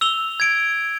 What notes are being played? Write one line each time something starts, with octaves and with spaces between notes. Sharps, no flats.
E6 F7 G7
G#6 D7